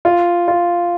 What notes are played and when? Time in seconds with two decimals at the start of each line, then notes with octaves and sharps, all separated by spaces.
0.05 F4
0.48 F4